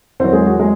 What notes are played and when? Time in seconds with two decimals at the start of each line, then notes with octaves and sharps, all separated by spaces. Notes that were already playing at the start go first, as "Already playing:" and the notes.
0.20 E2 D#3 F#3 C4 C5
0.33 G#3 G#4
0.46 F#4
0.59 G#3 G#4